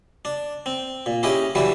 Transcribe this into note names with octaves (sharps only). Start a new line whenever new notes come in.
D4
C4
A#2
C#4 E4 G4 G#4 D#5
E3 F#3 G3 D4 E4